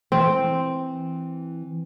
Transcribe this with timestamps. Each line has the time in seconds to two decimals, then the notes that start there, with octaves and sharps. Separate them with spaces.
0.12 E3 C4